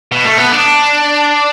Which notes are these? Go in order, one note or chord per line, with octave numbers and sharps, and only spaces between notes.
B2
A3
B3
D4